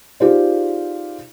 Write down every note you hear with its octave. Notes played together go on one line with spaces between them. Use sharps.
D#4 F4 G4 G#4 C5 D5